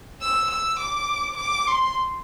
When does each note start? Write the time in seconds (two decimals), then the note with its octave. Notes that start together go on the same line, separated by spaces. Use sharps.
0.22 E6
0.50 E6
0.80 D6
1.37 D6
1.67 C6